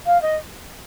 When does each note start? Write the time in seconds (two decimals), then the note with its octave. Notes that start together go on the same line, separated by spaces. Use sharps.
0.06 F5
0.22 D#5